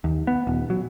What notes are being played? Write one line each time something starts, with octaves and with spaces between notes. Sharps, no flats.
D#2
B3
D#1
F#3